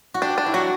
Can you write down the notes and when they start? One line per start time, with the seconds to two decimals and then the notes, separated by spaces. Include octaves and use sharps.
0.14 F#4
0.22 D4 G4
0.38 D4
0.46 E4
0.54 F#3 F#4